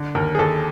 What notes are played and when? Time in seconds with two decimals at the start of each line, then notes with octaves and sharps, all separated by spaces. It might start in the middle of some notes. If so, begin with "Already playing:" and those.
Already playing: D3
0.15 D#2 A#4
0.35 G#4
0.39 D#2 A4